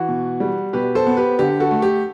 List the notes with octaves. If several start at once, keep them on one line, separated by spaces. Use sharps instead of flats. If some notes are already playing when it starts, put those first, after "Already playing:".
Already playing: E3 F#4
B2
G3
B2 G4 B4
A4 C5
B3
G4 B4
D3 G4
F#4 A4
A3
G4